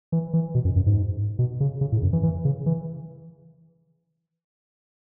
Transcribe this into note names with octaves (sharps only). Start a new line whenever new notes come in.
E3
E3
B2
F#2
F#2
G#2
B2
C#3
C#3
A2
F#2
E3
E3
C#3
E3